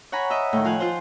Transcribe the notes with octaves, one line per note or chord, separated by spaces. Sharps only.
C#5 F#5 G#5 A#5 B5
D#5 E5
A2 D#3
F3 F5 G#5 F#6
F4 C5